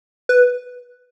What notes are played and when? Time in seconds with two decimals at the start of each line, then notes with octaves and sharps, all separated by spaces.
0.29 B4